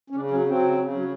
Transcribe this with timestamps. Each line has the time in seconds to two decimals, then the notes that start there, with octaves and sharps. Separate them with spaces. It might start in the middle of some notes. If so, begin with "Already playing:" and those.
0.10 C#4
0.15 C#3 D4
0.31 F#3 C#4
0.47 F#3 C4
0.62 C#3
0.78 C#3
0.93 F#3